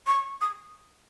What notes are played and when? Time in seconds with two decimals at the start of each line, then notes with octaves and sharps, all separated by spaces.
0.07 C#6
0.41 D#6